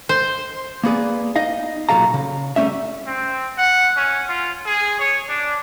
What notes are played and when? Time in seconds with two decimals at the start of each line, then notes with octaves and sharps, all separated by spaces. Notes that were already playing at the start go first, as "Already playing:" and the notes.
0.09 C5
0.84 A#3 B3 G#4 D5
1.35 D#4 D#5 F5
1.89 B1 A#2 F#3 A4 F5 A#5
2.14 C#3
2.56 G3 A3 C#4 E5
3.07 C4
3.58 F#5
3.97 C#4
4.29 F4
4.66 G#4
5.00 C#5
5.29 D4